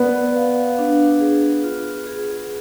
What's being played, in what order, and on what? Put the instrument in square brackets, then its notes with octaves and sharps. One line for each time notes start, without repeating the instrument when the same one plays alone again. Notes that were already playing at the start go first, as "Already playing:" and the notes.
Already playing: [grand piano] B3 [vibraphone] D5
[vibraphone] F5
D4
G#4
F4
G#4